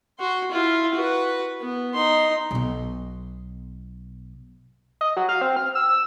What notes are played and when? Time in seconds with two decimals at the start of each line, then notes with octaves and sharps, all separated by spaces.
0.19 F#4 C6
0.52 E4 F4
0.94 F#4 B4
1.61 B3
1.94 D#4 C6
2.51 B1 B2
5.01 D#5
5.17 F#3
5.29 F5
5.41 C4
5.56 F6
5.75 E6
5.87 E6